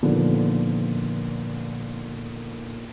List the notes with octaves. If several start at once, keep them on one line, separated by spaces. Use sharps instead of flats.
A#2 D3 D#3 F3 A#3 B3